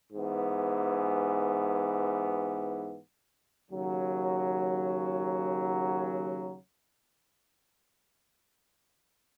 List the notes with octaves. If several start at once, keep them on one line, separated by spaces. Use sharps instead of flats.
G#2 E3 B3
D#2 C#3 F#3